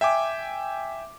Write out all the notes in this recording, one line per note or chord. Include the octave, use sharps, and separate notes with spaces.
E5 G5 G#5 D6